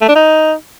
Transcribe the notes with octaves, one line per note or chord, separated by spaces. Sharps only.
A3
D4
D#4